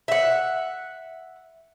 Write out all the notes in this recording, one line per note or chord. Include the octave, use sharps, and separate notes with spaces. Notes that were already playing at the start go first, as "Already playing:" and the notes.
E5 F#5